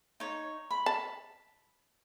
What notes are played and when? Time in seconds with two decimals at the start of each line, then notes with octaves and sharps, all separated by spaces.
0.20 D#4 C#5
0.71 B5
0.86 A5